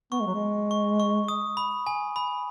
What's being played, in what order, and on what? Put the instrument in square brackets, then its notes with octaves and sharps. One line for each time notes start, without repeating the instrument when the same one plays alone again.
[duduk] B3 [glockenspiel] C#6
[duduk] G#3
F#3
G#3
[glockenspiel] C#6
C#6
D#6
B5
G#5
B5